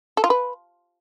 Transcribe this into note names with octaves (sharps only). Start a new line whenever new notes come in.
A4
F4
B4